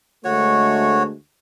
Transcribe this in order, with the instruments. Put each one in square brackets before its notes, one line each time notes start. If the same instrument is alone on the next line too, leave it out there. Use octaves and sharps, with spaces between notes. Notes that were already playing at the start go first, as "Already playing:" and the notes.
[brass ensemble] D2 G#3 A3 [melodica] F#4 C#5